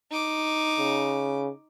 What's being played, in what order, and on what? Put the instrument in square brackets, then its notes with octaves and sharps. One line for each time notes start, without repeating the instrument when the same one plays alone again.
[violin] D#4 D6
[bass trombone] C#3